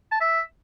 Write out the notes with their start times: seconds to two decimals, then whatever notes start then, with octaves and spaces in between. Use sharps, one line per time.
0.11 A5
0.21 E5